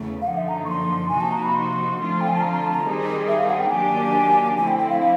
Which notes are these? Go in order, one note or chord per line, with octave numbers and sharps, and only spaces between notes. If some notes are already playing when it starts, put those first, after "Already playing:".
Already playing: E2 C#3 A3
F5
F#2 D3 F3 A#3 D#4 F#5
E5
A#5
C#6
C6
C3 F3 A#3 D#4 F#4 G#5
A5
A#5
B5
C6
D3 F3 A3 C4 F4
G5
G#5
A5
A#5
A#5
A5
A#5
D#3 G3 C4 D#4 G#4
E5
F5
F#5
G5
D#3 F#3 A#3 D4 G4 G#5
D3 F3 A3 C4 E4 G#5
G5
G5
F5
F5